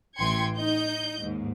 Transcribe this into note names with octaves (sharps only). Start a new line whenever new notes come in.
A1 E3 G5 C6 G#6 C#7
D#4 D#5 G6
D#2 G#2